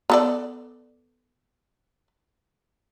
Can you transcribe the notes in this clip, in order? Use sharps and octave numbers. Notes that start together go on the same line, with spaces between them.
B3 A4 D5